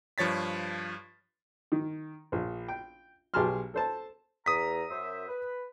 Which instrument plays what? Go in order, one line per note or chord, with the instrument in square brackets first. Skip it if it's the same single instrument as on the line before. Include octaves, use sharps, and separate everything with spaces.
[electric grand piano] G2 F3 C#5 A6 B6
[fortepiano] D#3
A#1
G5
B1 G4 G#4 A5 C6 F6
A4 C5 A5
[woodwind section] E2 A#5 [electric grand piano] D#6 B6
[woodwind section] F#2 C5 E5
B4